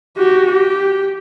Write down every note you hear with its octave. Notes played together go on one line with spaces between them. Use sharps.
F#4 G4
G4